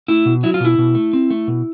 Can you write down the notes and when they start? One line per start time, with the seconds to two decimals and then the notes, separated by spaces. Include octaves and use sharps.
0.08 A3 E4
0.26 B2
0.43 F#3 E4
0.54 F4
0.60 B2 E4
0.78 B2
0.95 A3
1.13 C4
1.30 A3
1.47 B2